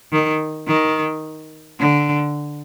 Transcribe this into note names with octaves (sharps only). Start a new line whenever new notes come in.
D#3
D#3
D3